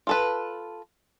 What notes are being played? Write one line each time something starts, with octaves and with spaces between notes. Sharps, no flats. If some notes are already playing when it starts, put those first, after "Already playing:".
F4 A4 B4